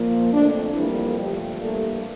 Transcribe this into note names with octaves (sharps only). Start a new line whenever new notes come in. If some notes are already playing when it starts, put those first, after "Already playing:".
Already playing: A#2 F3 A#3
F2 D3 A3 D4
F2 D3 E3 G3 A#3 E4
G2 D3 F3 G3 A3 G4
G2 E3 G3 A3 A#3 A4